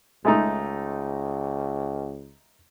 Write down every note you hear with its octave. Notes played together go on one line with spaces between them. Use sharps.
C#2 G#3 A3 D#4